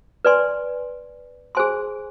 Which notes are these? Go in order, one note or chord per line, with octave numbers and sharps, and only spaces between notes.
B4 D5 G#5 C6
G#4 C5 G#5 C6